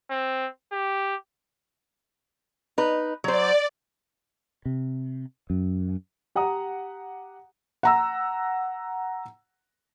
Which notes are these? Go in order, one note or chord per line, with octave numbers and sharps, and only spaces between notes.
C4
G4
D#4 B4
F#3 C5 D5
C3
F#2
G4 F#5 A#5 D#6
F#5 A#5 E6